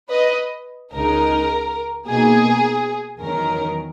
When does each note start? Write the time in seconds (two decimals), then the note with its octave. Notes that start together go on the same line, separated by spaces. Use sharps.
0.09 B4 D#5
0.94 C#2 C#3 G#3 D#4 A#4
2.07 B2 A#3 D#4 G#4
3.21 E2 D#3 F#3 C#4 A#4